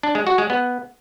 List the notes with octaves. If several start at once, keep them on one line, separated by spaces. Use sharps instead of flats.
D4
G#3
F#4
G#3
B3